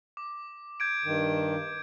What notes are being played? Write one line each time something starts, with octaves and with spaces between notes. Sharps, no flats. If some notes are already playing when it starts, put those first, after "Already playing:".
D6
G6 G#6 D7
G2 D#3